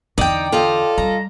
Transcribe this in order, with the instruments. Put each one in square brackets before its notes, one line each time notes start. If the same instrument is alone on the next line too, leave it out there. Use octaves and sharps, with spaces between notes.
[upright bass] E2 D3 [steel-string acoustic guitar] D#4 [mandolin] D5 G5
[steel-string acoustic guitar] F4 D#5 [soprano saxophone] A4
[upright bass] G3 [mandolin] A#5